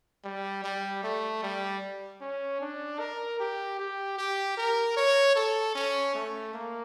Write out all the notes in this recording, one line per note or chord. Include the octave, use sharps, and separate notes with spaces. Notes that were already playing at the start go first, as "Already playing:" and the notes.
G3
G3
A3
G3
C#4
D4
A#4
G4
G4
G4
A#4
C#5
A4
C#4
A3
A#3